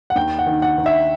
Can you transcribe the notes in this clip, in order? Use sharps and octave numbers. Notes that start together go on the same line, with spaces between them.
F#5
D#2 G5
F#5
D#3
F#5
D#3
E5